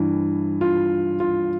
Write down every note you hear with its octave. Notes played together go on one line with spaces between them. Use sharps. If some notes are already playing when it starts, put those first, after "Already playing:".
Already playing: G2 E3
F4
F4